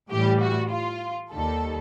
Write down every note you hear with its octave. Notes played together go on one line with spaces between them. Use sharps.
A2 E3 G3 G4
F#4
F4
D#2 D#3 G3 A4